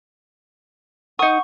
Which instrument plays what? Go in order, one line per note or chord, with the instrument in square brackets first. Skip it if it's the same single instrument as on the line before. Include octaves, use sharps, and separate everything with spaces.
[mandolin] D#4 D#6 [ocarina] F#5 [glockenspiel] C#6